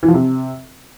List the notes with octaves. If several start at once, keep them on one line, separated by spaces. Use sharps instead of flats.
E3
F3
C3